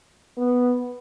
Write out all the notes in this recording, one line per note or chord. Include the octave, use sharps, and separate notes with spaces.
B3